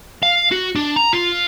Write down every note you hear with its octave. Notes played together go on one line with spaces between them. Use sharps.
F5
F#4
D4
A#5
F4